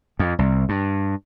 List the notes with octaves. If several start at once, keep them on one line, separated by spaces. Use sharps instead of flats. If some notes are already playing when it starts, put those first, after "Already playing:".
F2
C2
G2